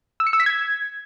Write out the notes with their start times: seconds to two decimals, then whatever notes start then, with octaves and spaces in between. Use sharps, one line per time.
0.20 E6
0.27 C#7
0.33 E6
0.40 B6
0.46 G#6